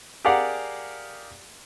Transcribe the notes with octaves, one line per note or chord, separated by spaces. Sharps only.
G4 G#4 A#4 D5 F5 F#5